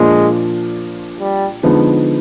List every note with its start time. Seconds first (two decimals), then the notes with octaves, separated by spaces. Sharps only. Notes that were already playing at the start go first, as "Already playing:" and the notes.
Already playing: A#2 F3 G#3 A#3 D4 F4
1.20 G3
1.63 D3 F3 G#3 B3 D#4